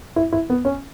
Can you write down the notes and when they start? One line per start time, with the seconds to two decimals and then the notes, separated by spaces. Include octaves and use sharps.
0.16 E4
0.32 E4
0.50 B3
0.65 C#4